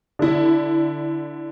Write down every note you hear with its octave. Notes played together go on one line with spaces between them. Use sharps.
D3 E4